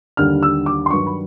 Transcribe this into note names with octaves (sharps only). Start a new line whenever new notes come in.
D#2 D3 G3 F6
E6
D6
C6
G2 D#3 F#3 C#6
B5